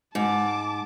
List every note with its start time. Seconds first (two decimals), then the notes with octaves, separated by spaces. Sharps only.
0.15 G#2 A5 D6